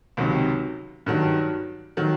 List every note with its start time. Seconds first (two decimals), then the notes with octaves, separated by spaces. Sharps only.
0.17 C#2 C3 D#3 F#3
1.06 G2 D#3 F#3
1.97 D#3 F#3